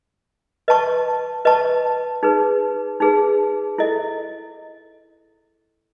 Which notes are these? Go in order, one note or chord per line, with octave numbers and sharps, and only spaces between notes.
B4 D#5 A5 C#6
B4 D#5 A5 C#6
D#4 G#4 B4
D#4 G#4 B4
E4 A4 D#5